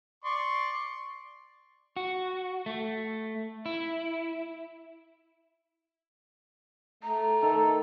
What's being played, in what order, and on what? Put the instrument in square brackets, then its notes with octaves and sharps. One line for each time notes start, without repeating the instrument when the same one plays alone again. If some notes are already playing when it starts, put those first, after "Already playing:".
[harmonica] D5 C6 C#6
[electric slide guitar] F#4
A3
E4
[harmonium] A3 [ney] A#5
[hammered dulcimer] D#3 [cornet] A4